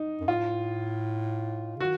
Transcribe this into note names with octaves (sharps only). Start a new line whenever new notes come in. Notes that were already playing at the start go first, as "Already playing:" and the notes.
Already playing: D#4
F#2
A2 F4
C#3
D#3 F#4